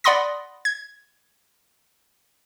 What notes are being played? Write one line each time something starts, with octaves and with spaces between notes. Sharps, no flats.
D5 F#5 B5 C6 D#6 A#6
G#6